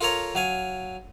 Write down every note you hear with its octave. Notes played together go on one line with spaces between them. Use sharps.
F4 A4 A#4 C#5 A#5
F#3 F5 G#5